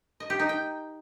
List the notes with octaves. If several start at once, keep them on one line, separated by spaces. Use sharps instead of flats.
D#5
G4
D#4
G5